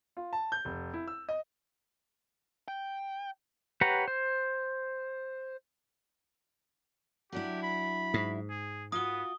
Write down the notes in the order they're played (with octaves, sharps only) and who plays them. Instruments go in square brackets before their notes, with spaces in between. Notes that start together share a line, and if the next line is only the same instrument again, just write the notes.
[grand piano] F4
A5
G6
F1
E4
E6
D#5
[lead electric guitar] G5
[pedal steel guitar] G4 B4 C#5 F#5 A#5
C5
[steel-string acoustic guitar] F#3 D4 E4 [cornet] G4
[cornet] B5
[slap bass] G#2
[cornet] G#4
[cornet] B3 [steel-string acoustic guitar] F4 F#4 [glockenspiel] D#6 G7